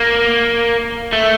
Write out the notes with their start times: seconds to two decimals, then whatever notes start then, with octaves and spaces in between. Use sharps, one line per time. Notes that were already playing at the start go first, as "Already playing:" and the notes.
Already playing: A#3
1.13 A3